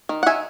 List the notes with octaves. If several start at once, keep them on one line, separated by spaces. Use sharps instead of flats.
D#3
F#5
D#3 E5 G#5